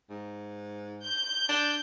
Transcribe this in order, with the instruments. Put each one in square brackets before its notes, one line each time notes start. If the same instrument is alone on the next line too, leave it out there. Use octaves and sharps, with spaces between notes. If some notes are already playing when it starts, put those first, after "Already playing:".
[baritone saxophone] G#2
[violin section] G6
[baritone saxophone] D4